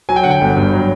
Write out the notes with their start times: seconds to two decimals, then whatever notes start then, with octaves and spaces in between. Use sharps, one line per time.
0.09 F#3 G#5
0.16 G5
0.24 D3 F#5
0.31 G5
0.41 G1
0.57 G2
0.73 F#3